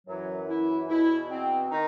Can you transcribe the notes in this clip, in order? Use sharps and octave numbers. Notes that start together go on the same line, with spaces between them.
F#2 E3 F#3
E4
E2 B2 E4
C4
D#3 D#4